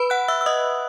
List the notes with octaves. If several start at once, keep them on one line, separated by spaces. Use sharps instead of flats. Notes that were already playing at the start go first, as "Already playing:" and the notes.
Already playing: B4 B5
F#5 F#6
E5 E6
E6
D#5 D#6